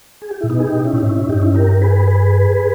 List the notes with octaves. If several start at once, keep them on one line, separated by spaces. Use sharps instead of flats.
G#4
G4
A#2 E4
B2 B3 D#4
G#4
D#4 G4
C#4 E4
A#2
D#4
G#2 C#4 E4
C#4 E4
G2 D#4 G4
C#4 E4
G4 A#4
G#4 B4
G#4 B4